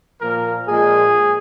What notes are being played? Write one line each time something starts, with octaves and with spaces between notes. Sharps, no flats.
A#2 F3 A#3 A#4
A#2 F3 G#3 G#4